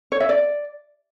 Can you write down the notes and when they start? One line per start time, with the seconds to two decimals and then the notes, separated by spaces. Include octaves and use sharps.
0.12 C#5
0.20 E5
0.29 D5